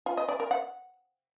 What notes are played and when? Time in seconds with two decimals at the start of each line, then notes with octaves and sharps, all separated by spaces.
0.06 F4
0.17 D#5
0.29 D5
0.40 A#4
0.51 F#5